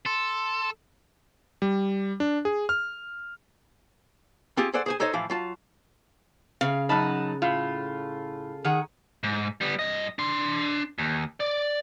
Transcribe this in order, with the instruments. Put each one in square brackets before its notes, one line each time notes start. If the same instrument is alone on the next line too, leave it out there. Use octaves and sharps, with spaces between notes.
[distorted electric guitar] A4 [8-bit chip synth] C6
[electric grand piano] G3
D4
G#4
F6
[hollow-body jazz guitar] C4 F4 G4 G#4
G#4 A4 C5 D5 F#5
G#4 C5 G#5
D#4 A4 C5 C#5 D#5
A2 E3 F3 F5
F#3 F4 A5
[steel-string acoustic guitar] C#3 [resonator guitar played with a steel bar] F5
[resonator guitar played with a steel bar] F#2 F#3 D#4 [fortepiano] A5 B5
[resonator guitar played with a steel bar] A2 [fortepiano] F4
[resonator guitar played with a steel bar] D#3 G#4 F#5
[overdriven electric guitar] G#2
G3 B3
G2 D#5
D4 C6
D#2
D5